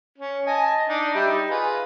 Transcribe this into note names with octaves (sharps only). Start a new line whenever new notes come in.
C#4
D#5 G#5 A5
D4 D#4
G3 G4 E5
D#4
F4 G#4 B4